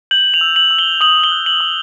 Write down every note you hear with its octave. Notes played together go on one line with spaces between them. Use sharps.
G6 F#7
F7
E6
F#7
E6
G7
D#6 F#7
G7
F#6
F#7
D#6